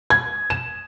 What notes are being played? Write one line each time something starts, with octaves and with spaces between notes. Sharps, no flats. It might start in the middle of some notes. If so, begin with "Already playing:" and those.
G#6
E7